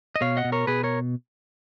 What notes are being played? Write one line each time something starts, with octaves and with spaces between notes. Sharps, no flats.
D#5
B2 C#5 F5
D#5 F#5
B2
A#4 C#5
B2 G#4 B4
A#4 C#5